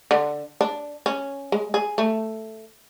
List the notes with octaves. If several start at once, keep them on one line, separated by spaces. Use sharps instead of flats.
D3
D4
C#4
G#3
G#4
A3